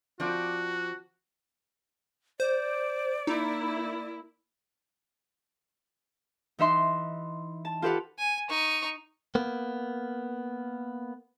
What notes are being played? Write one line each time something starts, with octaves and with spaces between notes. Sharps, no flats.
F3 C4 F#4 D5
C5 D5
A#3 D#4 E4
E3 D#4 E5 C6
A5
F4 G4 A4 B4 F5 F#5
G#5
D#4 C#6
A#3 B3